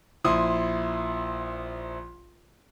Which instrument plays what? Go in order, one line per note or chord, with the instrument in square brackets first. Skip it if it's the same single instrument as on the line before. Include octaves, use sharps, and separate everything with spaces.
[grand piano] A#1 E4 C6 D#6